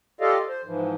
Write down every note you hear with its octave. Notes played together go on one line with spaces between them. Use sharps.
F4 G4 A4 D5 D#5 F5
C5
G#2 E3 F3